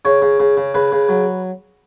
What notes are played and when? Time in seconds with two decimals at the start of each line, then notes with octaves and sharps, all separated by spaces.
0.05 C#3 C#5
0.22 C#3
0.40 C#3
0.57 C#3
0.74 C#3 B4
0.92 C#3
1.09 F#3